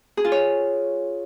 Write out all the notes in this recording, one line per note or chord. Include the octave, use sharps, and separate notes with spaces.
G#4
F4
C#5